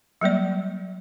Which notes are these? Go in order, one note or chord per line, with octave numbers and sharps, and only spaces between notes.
F#3 G3 A#3 D5